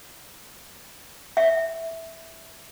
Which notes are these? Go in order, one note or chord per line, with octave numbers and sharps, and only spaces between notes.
E5